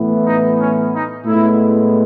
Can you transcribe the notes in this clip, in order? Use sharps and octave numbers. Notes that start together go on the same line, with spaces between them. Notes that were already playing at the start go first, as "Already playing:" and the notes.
Already playing: A2 E3 B3
D#4
C#4
D#4
A2 G#3 B3 E4